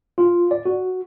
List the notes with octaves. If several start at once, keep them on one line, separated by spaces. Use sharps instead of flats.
F4
D5
F#4